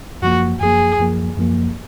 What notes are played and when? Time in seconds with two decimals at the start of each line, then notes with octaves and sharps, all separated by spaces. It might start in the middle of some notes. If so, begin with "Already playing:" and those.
0.22 F#2 F3 A#3 F#4
0.60 F#2 F3 A#3 G#4
0.99 F#2 F3 A#3
1.37 F#2 F3 A#3